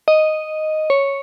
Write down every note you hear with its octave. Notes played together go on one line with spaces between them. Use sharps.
D#5
C#5